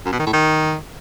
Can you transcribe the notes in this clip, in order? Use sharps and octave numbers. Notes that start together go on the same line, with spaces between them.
F#2
B2
D#3
A2
D#3